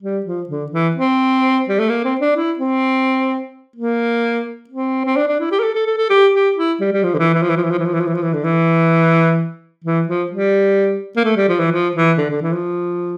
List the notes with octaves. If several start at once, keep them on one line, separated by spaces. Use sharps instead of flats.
G3
F3
D3
E3
C4
G3
A3
A#3
C4
D4
E4
C4
A#3
C4
C4
D4
D4
E4
G4
A#4
A4
A4
A4
A4
G4
G4
E4
G3
G3
F3
D3
E3
E3
F3
E3
F3
E3
F3
E3
F3
E3
F3
E3
F3
E3
D3
E3
E3
F3
G3
A#3
A3
G3
F3
E3
F3
E3
D3
D3
E3
F3